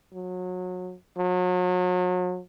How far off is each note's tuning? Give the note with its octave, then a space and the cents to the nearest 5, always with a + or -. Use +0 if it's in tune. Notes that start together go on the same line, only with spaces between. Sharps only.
F#3 -25
F#3 -35